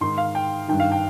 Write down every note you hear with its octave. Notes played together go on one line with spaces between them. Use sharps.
G#2 D#3 C6
F5
G5
G2 D#3 G5
F5
G5